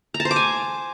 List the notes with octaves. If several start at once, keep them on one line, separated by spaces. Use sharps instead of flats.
A#5
A5
C5
D6
G#5